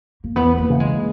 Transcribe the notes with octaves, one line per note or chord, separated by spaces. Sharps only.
A#3
E2 B3
A#3
C#3 E3
G#3